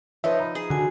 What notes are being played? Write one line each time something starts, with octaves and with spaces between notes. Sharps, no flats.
F3 D#4 B4 C#5 E5
A#5 B5
G#4
D3 F#4 G#5